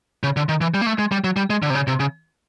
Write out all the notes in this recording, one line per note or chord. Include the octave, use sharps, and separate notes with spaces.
C#3
D3
D#3
E3
G3
A#3
A3
G#3
G3
F#3
G3
G#3
D3
C3
C#3
C3
C#3